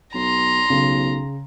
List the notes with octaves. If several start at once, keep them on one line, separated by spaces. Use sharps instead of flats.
B1 A#5 C6
B1 C#3